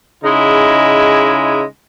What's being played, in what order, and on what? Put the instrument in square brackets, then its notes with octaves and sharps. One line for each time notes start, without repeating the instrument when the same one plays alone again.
[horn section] C#3 G#3 D#4 E4